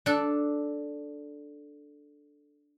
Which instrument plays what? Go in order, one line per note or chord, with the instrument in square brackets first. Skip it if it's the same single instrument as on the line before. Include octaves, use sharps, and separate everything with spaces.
[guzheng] D4 A4